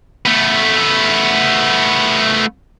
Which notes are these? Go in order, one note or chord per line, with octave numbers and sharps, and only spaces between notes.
A3 B3